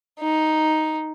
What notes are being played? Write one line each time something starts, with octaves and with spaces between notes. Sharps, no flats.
D#4